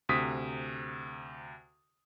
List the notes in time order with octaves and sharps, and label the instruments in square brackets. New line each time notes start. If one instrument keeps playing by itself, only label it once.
[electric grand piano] D2 C3 D#6 B6